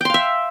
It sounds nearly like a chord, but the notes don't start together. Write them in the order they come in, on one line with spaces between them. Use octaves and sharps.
G5 C6 F5 E5